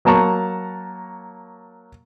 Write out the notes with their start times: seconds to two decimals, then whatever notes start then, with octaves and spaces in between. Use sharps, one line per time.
0.05 F#3 A#3 A5 A#5 C#6